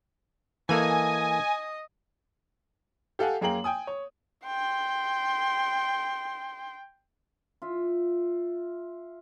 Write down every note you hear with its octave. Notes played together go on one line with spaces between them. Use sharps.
E3 A#3 A4 D#5 G#5
G4 A4 F5 F#5 G#5
F#2 A#3 G#4 G5 A#5 F#7
G5 G#5 D#6
C#5
G5 C6
F4 E5